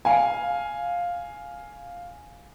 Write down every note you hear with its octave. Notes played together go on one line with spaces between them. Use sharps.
F5 G#5